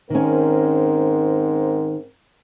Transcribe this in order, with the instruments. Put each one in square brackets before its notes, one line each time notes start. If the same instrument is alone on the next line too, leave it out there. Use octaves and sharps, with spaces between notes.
[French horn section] G#2 C4 A#4 [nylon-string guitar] D#3 C#4